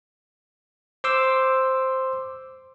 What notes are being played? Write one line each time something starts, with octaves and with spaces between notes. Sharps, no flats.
C5 C6 D6 E6